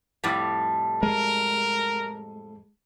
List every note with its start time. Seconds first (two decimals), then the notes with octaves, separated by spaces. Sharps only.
0.24 F2 A2 G3
1.03 G#3 A#4